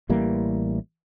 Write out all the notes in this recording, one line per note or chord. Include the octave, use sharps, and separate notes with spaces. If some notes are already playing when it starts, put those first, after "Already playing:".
A1 E3 G3 A#3